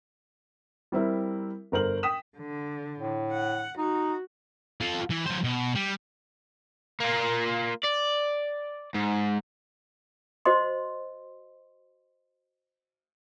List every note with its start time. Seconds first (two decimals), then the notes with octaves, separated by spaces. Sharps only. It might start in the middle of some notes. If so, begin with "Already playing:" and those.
0.92 G3 C4 E4 A#4
1.72 G1 A#4 C5 F#7
2.03 G5 D#6 B6 E7
2.38 D3
2.98 A2
3.31 F#5
3.78 D#4 F#4
4.81 F4 A4
5.10 E3
5.26 F#3 C5
5.44 B2
5.75 G3
7.00 A#3 F4
7.83 D5
8.95 G#2
10.46 F#4 C5 D#5 C6